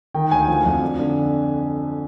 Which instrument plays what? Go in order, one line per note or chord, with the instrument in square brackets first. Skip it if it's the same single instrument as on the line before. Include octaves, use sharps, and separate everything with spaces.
[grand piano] D#3 G5
D2 G#5
F3
F2
D4
D3